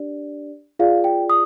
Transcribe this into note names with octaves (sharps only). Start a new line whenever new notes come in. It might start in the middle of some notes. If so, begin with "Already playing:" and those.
Already playing: D4 G4 D5
F4 G#4 D5 F5
G5
D#6